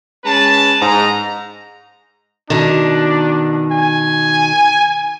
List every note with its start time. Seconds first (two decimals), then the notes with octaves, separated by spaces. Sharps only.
0.25 G#3 C#4 B4 A5
0.80 G#2 A#5
2.50 B2 D#3 D4
3.72 G#5